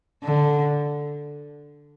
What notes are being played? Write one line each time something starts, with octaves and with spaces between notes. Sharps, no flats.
D3